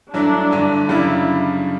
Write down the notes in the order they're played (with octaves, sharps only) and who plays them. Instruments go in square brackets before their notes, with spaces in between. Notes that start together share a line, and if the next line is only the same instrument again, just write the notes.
[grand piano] G2 F#3 A3 E4 [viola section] D4
[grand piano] G2 D3 A3
[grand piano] F#2 C#3 G3 D4 [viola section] E4